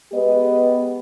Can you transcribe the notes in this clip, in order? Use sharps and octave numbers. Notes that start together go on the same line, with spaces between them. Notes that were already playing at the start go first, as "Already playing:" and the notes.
G#3 B3 G4 B4 D#5